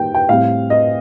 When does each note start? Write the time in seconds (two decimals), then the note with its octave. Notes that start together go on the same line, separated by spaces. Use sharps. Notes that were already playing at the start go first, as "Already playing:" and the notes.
Already playing: D#3 G3 A#3 G5
0.14 G5
0.28 A2 G3 C4 F5
0.70 D#5